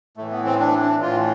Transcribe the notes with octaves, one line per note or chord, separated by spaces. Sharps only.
A2 E3 A3
B3
C4
D4
D4
A2 E3 F4